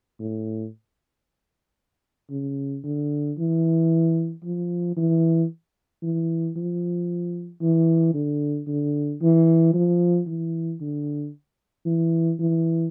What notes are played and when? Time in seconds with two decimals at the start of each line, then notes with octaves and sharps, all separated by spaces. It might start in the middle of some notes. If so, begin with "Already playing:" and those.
0.20 A2
2.31 C#3
2.84 D3
3.38 E3
4.44 F3
4.97 E3
6.02 E3
6.56 F3
7.62 E3
8.14 D3
8.68 D3
9.22 E3
9.74 F3
10.27 E3
10.81 D3
11.86 E3
12.39 E3